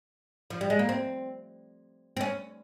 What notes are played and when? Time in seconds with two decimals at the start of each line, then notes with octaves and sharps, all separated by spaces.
0.50 F3
0.61 G3
0.70 G#3
0.79 A#3
0.89 C4
2.17 C4
2.21 C#4